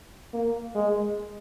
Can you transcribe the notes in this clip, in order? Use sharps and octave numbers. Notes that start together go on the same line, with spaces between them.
A#3
G#3